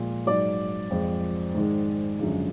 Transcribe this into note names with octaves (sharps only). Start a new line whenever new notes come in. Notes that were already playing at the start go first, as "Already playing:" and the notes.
Already playing: A#2 F3 G#3
G#2 F#3 D5 D6
F2 F3 G#3
G#2 D#3 G#3
F#2 D3 F3 G#3